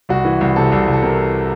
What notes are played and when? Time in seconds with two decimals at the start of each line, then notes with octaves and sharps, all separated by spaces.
0.09 C2 F#4
0.25 E3
0.41 C2
0.56 C3 A4
0.72 C2
0.87 C2
0.93 A4
1.02 C3 A#4